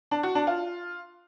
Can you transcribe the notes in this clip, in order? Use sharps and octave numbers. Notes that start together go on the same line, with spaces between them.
D4
F#4
D4
F4